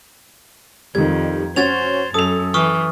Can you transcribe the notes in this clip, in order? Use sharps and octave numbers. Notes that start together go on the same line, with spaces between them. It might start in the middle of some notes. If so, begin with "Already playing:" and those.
F2 D#3 G3 G#6
C#4 F#4 C5 G#6 A6 F7
F#2 A4 D#6 F7
E3 C#6 D#6 F6